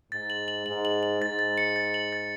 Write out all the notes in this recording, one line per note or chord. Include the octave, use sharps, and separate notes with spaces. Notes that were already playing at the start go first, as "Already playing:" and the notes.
G#2 A6
F#7
F#7
G#2 F#7
F#7
F#7
G#2 A6
A6
C#7
A6
F#7
A6